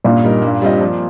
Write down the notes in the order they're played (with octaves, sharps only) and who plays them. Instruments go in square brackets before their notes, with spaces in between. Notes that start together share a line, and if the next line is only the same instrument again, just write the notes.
[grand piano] G2 [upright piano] A#2
[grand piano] G3 D#4 A#4
G2
G3 C4 F4 D#5
F3